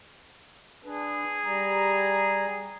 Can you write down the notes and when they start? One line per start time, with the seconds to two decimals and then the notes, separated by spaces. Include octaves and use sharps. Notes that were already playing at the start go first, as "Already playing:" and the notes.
0.85 D4 G#4 B4
1.45 G3 A#5